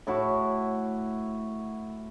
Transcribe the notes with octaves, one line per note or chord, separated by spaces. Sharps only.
A2 E4 F#4 D6